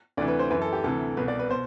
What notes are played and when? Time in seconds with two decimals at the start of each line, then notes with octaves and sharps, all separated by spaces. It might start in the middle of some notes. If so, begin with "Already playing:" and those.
0.17 D2 C3 E3 D5
0.28 B4
0.39 C5
0.50 F#2 E3 B4
0.62 A4
0.73 G4
0.84 D2 C3 E3 A4
1.17 C2 B2 B4
1.28 D5
1.39 B4
1.51 B2 C5